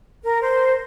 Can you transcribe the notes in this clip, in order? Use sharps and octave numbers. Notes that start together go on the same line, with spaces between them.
A#4
C5